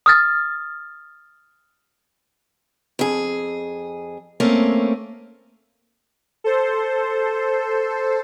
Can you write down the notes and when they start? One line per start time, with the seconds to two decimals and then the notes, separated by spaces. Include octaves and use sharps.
0.06 D#6 F6 A6
2.99 F2 G#4
4.40 A3 A#3 C4 C#4
6.44 A4 C5